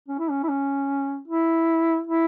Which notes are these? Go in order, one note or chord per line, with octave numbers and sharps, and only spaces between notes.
C#4
E4
C#4
E4
C#4
E4
E4